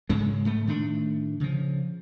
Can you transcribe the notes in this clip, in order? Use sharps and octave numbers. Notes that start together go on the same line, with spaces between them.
G#2 C#3 G#3
G#2 A3
A2 D#3 A3 D4
C#3 F3